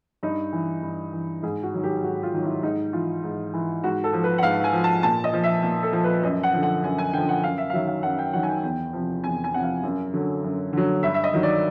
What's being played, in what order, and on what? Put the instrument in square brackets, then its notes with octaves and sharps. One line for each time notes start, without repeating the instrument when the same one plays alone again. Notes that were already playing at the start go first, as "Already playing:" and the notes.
[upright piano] G2 D#4
E3
G2
E3
G#2 G#4
F#4
D#3 F#3
G4
G#2 F#4
F4
D#3 F#3
E4
G#2 D#4
E3 F4
G#2
E3
G#2 F#4
A4
F3
B4
F#5
G#2 F5
G#5
F3
A5
A#2 A5
D#5
F3
E5
A#2
A4
F3
B4
F#2 D#5
F#5
D3 F3
F#5
F#2 G#5
G#5
D3 F3 G5
F#5
F#2 F5
E5
F5
D#3 F#3 E5
F5
F#2 F#5
G5
D#3 F#3 F#5
G#5
G5
E2 G5
C3 F3
E2 G#5
G#5
C3 F3 F#5
F5
F#2
D3 F#3
F#2
D3 F#3
G2 E5
E5
D#5
D#3 F#3
D5